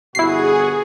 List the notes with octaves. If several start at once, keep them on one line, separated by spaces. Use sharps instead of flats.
G1 B2 E4 F#4 G#4 C7